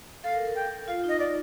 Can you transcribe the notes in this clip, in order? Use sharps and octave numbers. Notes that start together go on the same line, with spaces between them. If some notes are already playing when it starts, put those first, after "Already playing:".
A4 F5
A#4
A#4
G5
F4 F5
D#4 D#5
D#4 D5